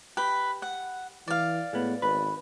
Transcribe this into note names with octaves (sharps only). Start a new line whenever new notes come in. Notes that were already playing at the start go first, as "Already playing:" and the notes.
G4 B4
F#5
E3 D5 F5
A2 G#3 B3
G#1 B4